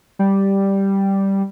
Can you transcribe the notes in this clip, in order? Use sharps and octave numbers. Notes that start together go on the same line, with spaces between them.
G3